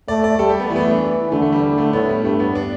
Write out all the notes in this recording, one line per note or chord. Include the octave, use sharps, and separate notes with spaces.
A3 D5
D5
G3 A4
G4
B3
E3 A3
B3
A3
D4
D3 A3
A3
G3
G3
A3
A2 B3
G3
G2 A3
B3
D4